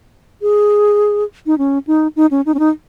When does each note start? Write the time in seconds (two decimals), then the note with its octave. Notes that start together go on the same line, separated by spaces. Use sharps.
0.42 G#4
1.46 D#4
1.58 C#4
1.87 D#4
2.16 D#4
2.31 C#4
2.46 D#4
2.54 C#4
2.59 D#4